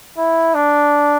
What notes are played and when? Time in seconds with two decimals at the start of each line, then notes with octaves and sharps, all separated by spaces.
0.17 E4
0.54 D4